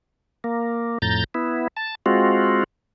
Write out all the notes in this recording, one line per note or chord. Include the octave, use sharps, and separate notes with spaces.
A#3
F2 A2 A#5 G6 A6
B3 E4
A5
G#3 C4 F4 F#4